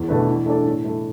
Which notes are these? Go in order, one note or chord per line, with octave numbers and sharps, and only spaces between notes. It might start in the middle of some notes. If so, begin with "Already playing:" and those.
Already playing: E2
B2 A3 D4 B4
E3
A3 D4 A4 D5
A2
A3 E4